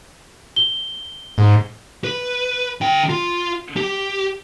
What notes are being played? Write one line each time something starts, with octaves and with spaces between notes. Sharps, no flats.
G7
G#2
B4
D3 G5
F4
G4